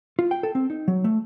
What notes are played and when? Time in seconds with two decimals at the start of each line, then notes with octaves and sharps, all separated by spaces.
0.19 F4
0.31 G5
0.43 A4
0.55 C4
0.70 D#4
0.88 F#3
1.04 A3